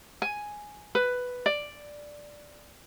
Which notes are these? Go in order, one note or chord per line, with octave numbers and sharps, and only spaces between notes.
G#5
B4
D5